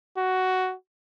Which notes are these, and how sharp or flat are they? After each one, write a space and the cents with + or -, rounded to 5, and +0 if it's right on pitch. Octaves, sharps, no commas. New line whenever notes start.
F#4 +10